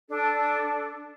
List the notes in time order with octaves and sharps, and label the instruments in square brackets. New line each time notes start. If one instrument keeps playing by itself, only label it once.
[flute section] D4 A4